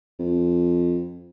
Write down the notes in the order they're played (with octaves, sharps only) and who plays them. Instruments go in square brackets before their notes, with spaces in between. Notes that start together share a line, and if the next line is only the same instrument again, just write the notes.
[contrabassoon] F2